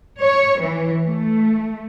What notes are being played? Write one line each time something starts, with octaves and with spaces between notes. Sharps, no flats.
C#5
E3
A3